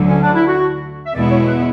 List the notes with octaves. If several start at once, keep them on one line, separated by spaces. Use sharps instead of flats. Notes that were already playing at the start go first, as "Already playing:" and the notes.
Already playing: D2 D3 F#3
C#4
D4
E4
F#4
E5
E2 B2 G#3 B3 E4 D5
C#5
B4